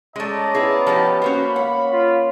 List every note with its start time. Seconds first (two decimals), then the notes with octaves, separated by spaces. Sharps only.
0.16 G#3 A3 C#4 D5 D#5 A#5
0.55 B3 E4 G#4
0.87 F3 G3 G4
1.22 A#3 C#4 F#4 C5 B5
1.56 C#5 F5 F#5
1.92 F4